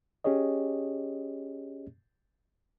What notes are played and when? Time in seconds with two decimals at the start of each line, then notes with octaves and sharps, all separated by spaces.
0.24 C#4 G4 G#4 C#5 D#5